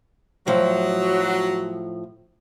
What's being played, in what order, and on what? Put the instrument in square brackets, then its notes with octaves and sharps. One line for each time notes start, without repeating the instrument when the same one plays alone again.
[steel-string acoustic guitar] A2 F3 [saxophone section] F#3